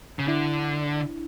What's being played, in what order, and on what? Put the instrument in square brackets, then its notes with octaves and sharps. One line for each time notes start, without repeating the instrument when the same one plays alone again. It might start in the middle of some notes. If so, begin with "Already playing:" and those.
[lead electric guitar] C#3
[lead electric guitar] D3 [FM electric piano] D4 E4